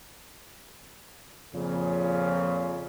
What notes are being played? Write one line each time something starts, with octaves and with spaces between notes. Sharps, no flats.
F2 A#2 C#3